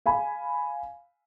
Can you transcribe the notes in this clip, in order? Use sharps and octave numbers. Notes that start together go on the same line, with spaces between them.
F5 G#5 B5